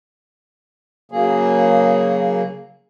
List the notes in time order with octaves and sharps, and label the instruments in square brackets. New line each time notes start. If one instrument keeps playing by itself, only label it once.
[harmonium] C#3 F#3 A#3 G#4